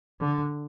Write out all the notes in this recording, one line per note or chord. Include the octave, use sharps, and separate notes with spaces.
D3